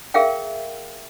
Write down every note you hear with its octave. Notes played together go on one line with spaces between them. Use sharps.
G#4 A#4 E5 F5 G5